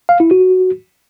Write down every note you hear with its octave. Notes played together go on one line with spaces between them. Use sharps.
F5
E4
F#4